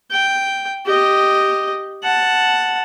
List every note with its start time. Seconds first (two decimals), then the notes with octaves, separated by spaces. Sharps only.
0.11 G5
0.86 G4 D#5
2.03 F#5 A5